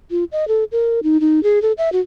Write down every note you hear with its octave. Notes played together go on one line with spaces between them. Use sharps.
F4
D#5
A4
A#4
D#4
D#4
G#4
A4
E5
F#4